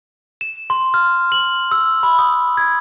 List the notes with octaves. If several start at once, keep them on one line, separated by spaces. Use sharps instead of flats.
E7
C6
F6
F#7
E6
B5
D#6
G#6